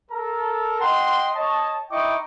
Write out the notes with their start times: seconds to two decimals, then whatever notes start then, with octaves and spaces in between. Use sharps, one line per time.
0.10 A4 A#4 A#5
0.81 D#5 F#5 G5 C6
1.33 C#5 D#5 A5
1.90 D#4 E4 D#5 G5 C#6 D6